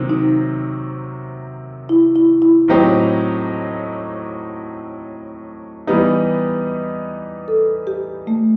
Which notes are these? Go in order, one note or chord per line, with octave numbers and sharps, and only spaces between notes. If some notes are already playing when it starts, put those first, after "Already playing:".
Already playing: C3 D#3 F#3 C4
D#4
E4
E4
E4
A2 F#3 C4 D#4 G4
E3 G3 B3 D#4 G4
A4
G4
A3